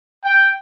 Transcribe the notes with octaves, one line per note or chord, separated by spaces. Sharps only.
G5